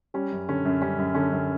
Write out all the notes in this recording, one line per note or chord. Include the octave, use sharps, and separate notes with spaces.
G3 C#4
F#2
D3 C#4
F#2
G3 C#4
F#2
D3 C#4
F#2